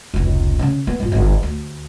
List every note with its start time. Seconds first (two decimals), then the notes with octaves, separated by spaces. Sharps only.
0.14 F1 C#2
0.59 C#3 C#4
0.87 B3
1.00 G2 F4
1.12 G1 D3
1.43 D2